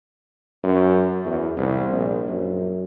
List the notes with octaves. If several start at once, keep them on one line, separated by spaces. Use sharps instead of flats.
F#2
E2
C2
A#1
F#2